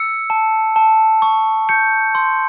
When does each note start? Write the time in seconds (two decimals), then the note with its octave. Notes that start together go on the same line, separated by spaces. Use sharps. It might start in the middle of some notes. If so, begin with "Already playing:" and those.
Already playing: E6 C#7
0.30 A5
0.76 A5
1.22 C#6
1.69 G6 C#7
2.15 C6